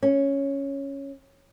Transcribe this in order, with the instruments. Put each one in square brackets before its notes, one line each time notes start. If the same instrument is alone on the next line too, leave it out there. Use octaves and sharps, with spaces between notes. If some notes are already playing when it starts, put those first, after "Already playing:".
[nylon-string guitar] C#4